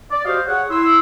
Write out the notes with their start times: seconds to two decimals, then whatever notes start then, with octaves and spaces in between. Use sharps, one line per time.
0.11 D5
0.25 F#4 G4 C5 D5 D#5 F5
0.47 G#4 C#5 F#5
0.70 E4 C6 E6